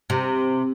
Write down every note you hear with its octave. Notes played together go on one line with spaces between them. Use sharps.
C3